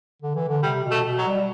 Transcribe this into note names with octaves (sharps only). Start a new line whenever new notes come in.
D3
E3
D3
C3 G3
B2
A3
B2
F#3
G3